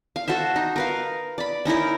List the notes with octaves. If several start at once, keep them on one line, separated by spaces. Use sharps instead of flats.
F5
F#4 A4 C5 E5
D#4
A#4 B4 F5
D5 B5
C#4 D#4 E4 A#4